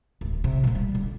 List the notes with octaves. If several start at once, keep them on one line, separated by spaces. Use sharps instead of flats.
D1 E3
C3
F2 A#2
G3
D3